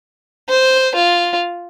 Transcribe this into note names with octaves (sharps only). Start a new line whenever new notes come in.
C5
F4